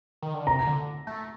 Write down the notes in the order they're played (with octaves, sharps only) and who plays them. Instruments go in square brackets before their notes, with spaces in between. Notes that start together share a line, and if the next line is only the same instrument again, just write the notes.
[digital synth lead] D#3
D3
[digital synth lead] C3 [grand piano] A#5
[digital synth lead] D3
A3